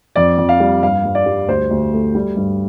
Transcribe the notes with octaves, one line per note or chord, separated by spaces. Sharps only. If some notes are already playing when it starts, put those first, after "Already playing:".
F2 D5
F2
F5
G3
G2 F5
G2
D5
G3
D2 C5
D2
A3
G3
G2